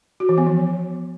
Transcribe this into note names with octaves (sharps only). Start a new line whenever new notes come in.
F#4
E3
B3
F3